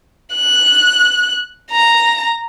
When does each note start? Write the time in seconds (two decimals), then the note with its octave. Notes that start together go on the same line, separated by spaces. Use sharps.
0.35 F#6
1.71 A#5